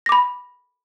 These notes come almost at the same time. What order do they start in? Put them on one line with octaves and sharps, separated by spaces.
A#6 D6 B5